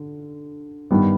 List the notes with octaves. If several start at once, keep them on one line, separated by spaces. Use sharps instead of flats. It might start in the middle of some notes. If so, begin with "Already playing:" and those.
Already playing: D3
G2 D#3 G3 B3